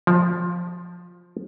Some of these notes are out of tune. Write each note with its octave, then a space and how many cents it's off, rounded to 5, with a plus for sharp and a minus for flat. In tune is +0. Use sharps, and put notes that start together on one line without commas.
F3 +10